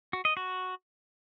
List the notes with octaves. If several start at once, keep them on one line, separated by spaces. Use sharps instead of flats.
F#4
D#5
F#4